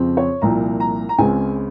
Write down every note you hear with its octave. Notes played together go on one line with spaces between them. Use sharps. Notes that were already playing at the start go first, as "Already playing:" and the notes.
Already playing: F2 C#3 F3 C4
C#5
C2 A#2 F3 A#5
A#5
A#5
C#2 C#3 G#3 C4 G#5